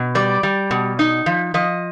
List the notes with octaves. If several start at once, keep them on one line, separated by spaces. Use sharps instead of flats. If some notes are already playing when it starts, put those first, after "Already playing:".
Already playing: B2
G3 D5
G3
B2
D#4
F3
F3 D#5